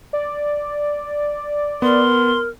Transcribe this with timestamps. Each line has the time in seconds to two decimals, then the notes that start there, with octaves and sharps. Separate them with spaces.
0.13 D5
1.82 B3 A#4 C6